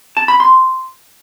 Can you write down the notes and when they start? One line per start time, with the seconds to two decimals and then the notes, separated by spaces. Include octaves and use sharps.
0.17 A5
0.28 B5
0.40 C6